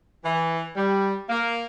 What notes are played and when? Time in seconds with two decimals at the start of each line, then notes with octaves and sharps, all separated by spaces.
0.25 E3
0.76 G3
1.29 A#3